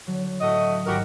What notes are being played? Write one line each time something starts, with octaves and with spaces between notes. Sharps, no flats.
D3 F#3
A2 A3 F#4 D#5
G#1 D#2 G#2 F#4 G4 A#4